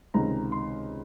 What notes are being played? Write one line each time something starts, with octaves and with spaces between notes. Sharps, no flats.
C#2 C3 D#3 A#5
C6